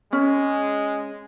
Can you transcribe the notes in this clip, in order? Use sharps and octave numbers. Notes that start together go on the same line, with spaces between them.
G#3 C#4